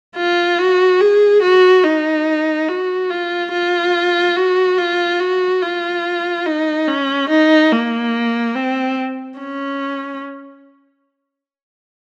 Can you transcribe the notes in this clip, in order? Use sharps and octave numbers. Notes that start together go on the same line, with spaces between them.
F4
F#4
G#4
F#4
D#4
F#4
F4
F4
F#4
F4
F#4
F4
D#4
C#4
D#4
A#3
C4
C#4